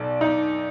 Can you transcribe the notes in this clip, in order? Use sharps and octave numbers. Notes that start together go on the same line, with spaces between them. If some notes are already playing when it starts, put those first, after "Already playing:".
Already playing: B1 D5
D#4